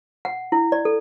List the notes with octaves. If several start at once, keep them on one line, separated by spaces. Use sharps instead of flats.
F#5
E4
D5
A4